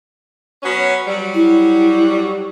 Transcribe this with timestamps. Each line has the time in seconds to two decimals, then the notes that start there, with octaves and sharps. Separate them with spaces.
0.63 F#3 B3 C#4
1.08 F#3 G3
1.34 E4